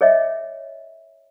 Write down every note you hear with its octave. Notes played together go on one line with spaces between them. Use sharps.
G#4 C#5 D#5 E5